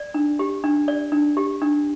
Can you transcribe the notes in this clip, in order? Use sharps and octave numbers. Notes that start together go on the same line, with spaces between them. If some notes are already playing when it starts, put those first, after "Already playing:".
Already playing: D5
D4
G4
D4
D5
D4
G4
D4